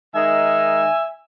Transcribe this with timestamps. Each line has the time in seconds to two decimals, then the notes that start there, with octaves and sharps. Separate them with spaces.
0.14 D#3 G#3 D#4 E5 G#5